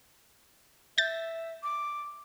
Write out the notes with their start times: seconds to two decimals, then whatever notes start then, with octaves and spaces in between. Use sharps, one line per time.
0.98 E5 G6 A6
1.63 D6